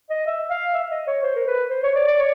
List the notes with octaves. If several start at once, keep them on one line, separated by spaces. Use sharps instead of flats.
D#5
E5
F5
E5
D#5
C#5
C5
A#4
B4
C5
C#5
D5
D5
C#5